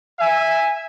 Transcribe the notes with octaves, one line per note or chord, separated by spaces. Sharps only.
E5 G#5